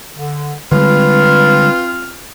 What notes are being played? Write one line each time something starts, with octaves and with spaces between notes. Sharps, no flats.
D3
D3 G3 G#3 C4 F4 B4 F6